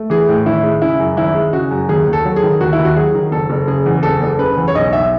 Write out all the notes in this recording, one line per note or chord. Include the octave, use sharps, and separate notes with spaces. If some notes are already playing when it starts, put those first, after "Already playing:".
Already playing: A3
E3 G#4
A2
G#1 E4
G#3
C#3 E4
F#2
G#1 E4
G#3
C#3 F#4
F#2
D#2 G#4
D#2
A4
F#3
G#4
D#3
D#2 F#4
D#2 E4
F#4
F#3 G#4
D#3
F#1 A4
F#1
C#3 G#4
E2
F#1 A4
F#1
C#3 B4
E2
C#5
B1 D#5
B1 E5